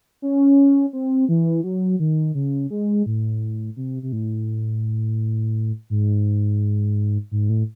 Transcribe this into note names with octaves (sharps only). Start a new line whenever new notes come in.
C#4
C4
E3
F#3
D#3
C#3
G#3
A2
C3
C3
A2
G#2
G#2
A2